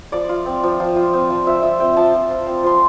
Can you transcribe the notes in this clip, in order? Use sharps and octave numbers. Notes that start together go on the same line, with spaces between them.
F3 D5
F4
C4
F3
F3
F4
C4
F3
F3 E5
F4 E5
C4 G5
F3 A5
F3
F4
C4
F3 C6